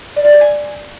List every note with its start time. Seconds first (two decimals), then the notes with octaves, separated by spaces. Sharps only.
0.16 D5
0.25 F4
0.33 G4
0.41 G#5